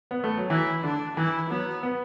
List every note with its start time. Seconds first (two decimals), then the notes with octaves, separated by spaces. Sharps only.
0.11 B3
0.24 A3
0.37 F#3
0.50 E3 E4
0.83 D3 D4
1.16 E3 E4
1.50 F#3 B3
1.83 B3